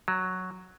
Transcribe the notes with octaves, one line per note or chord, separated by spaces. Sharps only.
F#3